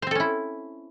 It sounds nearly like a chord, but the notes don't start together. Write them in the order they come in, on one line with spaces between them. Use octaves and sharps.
C5 C4 A4 C#4 E4